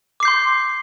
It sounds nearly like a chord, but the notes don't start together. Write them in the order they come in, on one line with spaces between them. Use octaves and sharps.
D6 C7 G6 C6